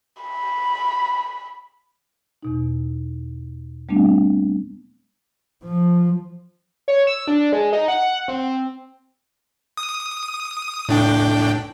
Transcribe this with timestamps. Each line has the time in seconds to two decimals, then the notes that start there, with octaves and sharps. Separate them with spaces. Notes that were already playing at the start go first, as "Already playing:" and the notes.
0.22 B5
2.43 E2 B2 D#4
3.89 G3 A3 B3 C4 D4
5.64 F3
6.88 C#5
7.07 E6
7.28 D4
7.52 G#3
7.73 D#4
7.88 F#5
8.28 C4
9.77 D#6
10.89 A2 D4 G5